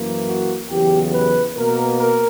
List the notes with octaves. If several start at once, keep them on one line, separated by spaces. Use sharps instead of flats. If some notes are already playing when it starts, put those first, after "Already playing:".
Already playing: F#2 E3 A#3
F#4
E2 C#3 F#3 G4
B4
B2 A#3 A#4
A#4